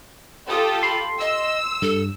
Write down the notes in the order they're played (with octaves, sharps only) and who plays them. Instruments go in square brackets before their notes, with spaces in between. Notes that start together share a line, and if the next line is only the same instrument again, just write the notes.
[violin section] F4 G4 A4 [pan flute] D#6
[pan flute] B5 [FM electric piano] C6
[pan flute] D#5 [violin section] E6
[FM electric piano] G2 [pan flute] A4